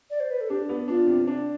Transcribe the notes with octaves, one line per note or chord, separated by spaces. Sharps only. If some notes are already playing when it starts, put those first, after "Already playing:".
D5
C5
B4
A4
D4 G4
B3
D4 F4
C3
D4